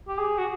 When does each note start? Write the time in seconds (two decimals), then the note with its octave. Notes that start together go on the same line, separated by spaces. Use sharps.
0.08 G4
0.19 G#4
0.38 F#4